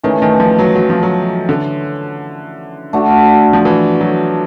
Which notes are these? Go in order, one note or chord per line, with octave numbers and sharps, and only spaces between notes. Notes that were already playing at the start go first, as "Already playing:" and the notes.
D#3 E3 A3 C#4
D#3
F3
F#3
F#3
F3
F#3
D3
A3 D4 F#4
F3
E3
F#3